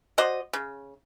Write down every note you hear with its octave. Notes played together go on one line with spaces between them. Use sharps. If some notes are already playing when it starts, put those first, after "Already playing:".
F#4 C5 D5 D#5
C#3